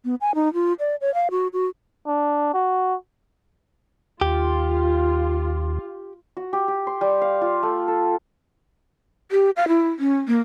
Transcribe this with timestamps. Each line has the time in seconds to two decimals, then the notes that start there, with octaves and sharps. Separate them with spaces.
0.05 B3
0.21 G#5
0.35 D#4
0.54 F4
0.80 D5
1.01 C#5
1.14 F5
1.31 F#4
1.53 F#4
2.07 D4
2.54 F#4
4.21 D#2 F4 G4
6.37 F#4
6.53 G4
6.68 G4
6.87 C6
7.01 G3
7.22 F5
7.41 F4
7.63 A3
7.88 A4
9.31 G4
9.56 F5
9.68 E4
9.99 C#4
10.27 A#3